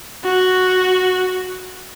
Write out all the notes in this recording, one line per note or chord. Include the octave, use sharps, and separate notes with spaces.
F#4